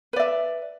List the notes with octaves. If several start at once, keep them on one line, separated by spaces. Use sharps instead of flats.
B4 D5 E5